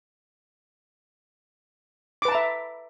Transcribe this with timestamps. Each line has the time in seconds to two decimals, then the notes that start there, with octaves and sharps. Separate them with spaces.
2.22 D6
2.25 B4
2.28 A5
2.32 A#5
2.35 E5